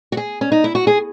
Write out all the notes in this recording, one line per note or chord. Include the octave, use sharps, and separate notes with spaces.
F#4
G#4
C#4
D#4
E4
F#4
G#4